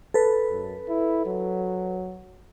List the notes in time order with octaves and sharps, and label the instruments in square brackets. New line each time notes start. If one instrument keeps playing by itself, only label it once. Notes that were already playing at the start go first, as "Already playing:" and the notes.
[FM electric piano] A4 B4
[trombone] F#2
E4
F#3